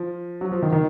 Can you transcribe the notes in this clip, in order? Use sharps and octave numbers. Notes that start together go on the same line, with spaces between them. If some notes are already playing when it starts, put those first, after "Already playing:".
Already playing: F3
F#3
F3
D#3
D#3